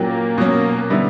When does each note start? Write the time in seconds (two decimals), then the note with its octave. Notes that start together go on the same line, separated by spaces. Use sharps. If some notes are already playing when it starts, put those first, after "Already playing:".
Already playing: A#2 F#3 A#3 C#4 G4
0.38 B2 F#3 C#4
0.90 D3 G3 B3 E4